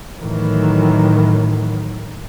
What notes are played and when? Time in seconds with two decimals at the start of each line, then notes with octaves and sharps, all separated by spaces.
0.20 A2 D#3 E3 F#3